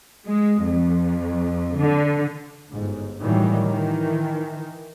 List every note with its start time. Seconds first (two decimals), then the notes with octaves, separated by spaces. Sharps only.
0.27 G#3
0.63 F2
1.76 D3
2.68 G1 G#2
3.20 A2 D#3 E3 F#3 G3
3.66 D#3 E3